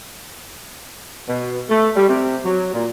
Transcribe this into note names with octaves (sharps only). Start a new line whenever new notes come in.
B2
A3
G3
C3
F#3
A#2